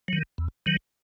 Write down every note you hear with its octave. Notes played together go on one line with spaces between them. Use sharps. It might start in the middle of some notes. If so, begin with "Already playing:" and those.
D#3 F#3
E2
D#3 F#3